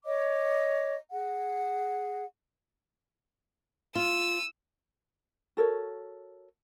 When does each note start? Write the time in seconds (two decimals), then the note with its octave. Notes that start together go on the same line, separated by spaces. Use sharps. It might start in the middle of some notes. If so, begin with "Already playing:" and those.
0.06 C#5 D#5 D6
1.11 G#4 F#5
3.95 F4 E6 D#7
5.57 F#4 A4 A#4 C#5